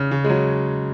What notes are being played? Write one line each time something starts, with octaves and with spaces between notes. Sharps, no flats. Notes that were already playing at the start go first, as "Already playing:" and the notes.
Already playing: C#3
C#3
G#3
F#3